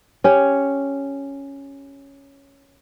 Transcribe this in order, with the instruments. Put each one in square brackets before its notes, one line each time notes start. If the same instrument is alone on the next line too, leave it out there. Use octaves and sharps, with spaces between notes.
[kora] C#4 G4 C#5